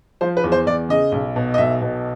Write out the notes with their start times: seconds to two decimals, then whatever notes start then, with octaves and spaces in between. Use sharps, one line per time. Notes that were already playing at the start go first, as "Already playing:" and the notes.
0.21 F3 C5
0.37 B4
0.44 E2
0.52 C5
0.66 E2 D5
0.89 C#3 D#5
1.12 B1
1.36 B2
1.54 D#5
1.58 B1 E5
1.82 B2